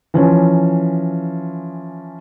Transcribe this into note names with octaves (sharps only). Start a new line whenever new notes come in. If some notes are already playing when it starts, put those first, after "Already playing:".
E3 F3 C#4